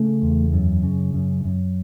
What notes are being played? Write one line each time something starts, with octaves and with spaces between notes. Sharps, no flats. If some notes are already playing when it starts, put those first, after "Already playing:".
Already playing: C#3 A3
E2
F#2
C#3
F#2
F#2